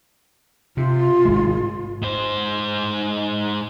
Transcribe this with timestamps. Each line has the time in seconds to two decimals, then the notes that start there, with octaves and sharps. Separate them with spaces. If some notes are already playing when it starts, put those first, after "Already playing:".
0.77 C3 F4
1.25 G#1 G#3
2.02 G#2 C5